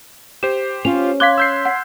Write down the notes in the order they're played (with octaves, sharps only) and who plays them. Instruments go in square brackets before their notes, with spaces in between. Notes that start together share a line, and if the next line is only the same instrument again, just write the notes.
[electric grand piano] G4 C5 [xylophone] E7
[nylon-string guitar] C#4 [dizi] F4 [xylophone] F7
[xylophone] F5 D6 G7 [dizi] C6 [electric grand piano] F#6 G#6 B6
[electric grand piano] E6 G6 C7
[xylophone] F#5